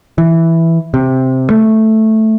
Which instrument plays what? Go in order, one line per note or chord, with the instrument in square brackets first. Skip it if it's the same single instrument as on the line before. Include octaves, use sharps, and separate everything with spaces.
[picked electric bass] E3
C3
A3